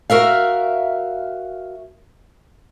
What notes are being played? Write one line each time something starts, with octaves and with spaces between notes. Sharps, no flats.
F#4 A#4 E5 F5